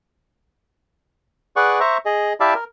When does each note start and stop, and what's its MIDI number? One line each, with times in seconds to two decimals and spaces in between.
1.56 1.80 68
1.56 1.80 71
1.56 1.80 74
1.56 1.80 78
1.56 1.80 85
1.80 1.98 72
1.80 1.98 76
1.80 1.98 82
1.80 1.98 85
2.05 2.33 68
2.05 2.33 75
2.40 2.54 64
2.40 2.54 67
2.40 2.54 74
2.40 2.54 76
2.40 2.54 77
2.40 2.54 81
2.55 2.64 70